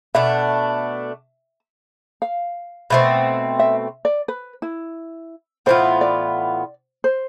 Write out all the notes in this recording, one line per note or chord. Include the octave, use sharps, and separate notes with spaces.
B2 A3 D4 E5
F5
B2 A3 C4
E5
D5
B4
E4
A2 E3 B3 F4 C5
D5
C5